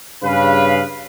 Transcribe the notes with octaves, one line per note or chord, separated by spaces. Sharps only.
G2 C#3 B4 F5